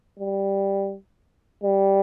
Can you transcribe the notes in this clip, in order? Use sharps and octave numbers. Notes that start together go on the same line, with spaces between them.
G3
G3